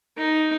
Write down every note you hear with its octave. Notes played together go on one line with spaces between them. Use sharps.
D#4